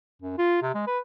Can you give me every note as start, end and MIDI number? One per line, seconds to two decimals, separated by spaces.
0.22 0.36 42
0.38 0.62 65
0.62 0.71 48
0.75 0.84 56
0.87 0.99 71